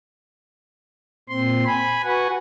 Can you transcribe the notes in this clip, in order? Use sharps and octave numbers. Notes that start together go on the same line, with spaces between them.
A#2 C4 C6
G#5 B5
F#4 B4 F#5 G#5